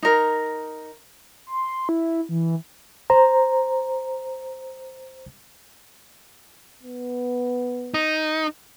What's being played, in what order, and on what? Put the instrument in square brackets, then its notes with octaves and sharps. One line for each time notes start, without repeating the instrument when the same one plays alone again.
[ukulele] D#4 A#4
[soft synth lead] C6
E4
E3
[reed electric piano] C5 A#5
[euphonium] B3
[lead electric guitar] D#4